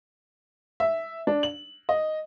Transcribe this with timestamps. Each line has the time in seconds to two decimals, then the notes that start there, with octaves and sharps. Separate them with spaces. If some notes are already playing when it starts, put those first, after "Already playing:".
0.80 E5
1.27 D4
1.43 F#7
1.89 D#5